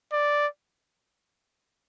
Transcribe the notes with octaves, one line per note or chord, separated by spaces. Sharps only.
D5